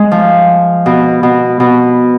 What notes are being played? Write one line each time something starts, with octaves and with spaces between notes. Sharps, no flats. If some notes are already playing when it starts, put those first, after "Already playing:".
Already playing: G#3
F3
B2
B2
B2